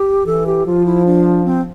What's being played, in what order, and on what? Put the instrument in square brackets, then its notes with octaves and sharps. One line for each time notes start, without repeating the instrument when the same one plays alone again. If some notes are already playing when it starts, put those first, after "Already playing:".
Already playing: [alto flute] G4
[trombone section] E3 [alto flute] A4
[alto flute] G4
[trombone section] F3 [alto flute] F4
[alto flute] E4
D4
C4